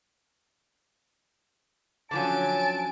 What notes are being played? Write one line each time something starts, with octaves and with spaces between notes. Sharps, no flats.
D3 F3 F#3 C#4 G#5 A5 D7